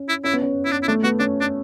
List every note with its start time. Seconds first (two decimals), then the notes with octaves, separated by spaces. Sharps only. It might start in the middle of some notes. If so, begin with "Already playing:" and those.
Already playing: C#4
0.09 E4
0.24 C#4 E4
0.33 B3
0.42 C#4
0.65 E4
0.71 D4
0.83 E4
0.88 A3 D4
1.04 B3 F#4
1.19 C#4 D4
1.41 D4